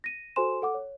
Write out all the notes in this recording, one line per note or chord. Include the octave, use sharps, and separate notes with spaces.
A#6 D#7
F#4 A4 C5 G#5 C6 E7
A4 F#5 D6
C#5